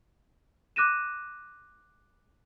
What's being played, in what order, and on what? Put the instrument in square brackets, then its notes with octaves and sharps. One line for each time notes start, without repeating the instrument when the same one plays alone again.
[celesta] D6 F#6 A#6 D#7 E7